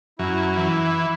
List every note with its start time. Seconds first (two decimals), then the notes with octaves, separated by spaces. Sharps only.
0.19 F#2 E4
0.57 E3